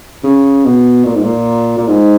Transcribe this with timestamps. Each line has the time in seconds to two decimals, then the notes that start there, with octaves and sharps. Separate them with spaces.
0.24 C#3
0.65 B2
1.06 A#2
1.15 G#2
1.23 A#2
1.78 A#2
1.88 G#2